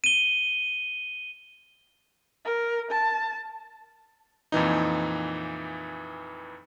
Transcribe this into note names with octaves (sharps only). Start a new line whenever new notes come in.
D#7 G7
A#4
A5
F2 A#2 E3 D#4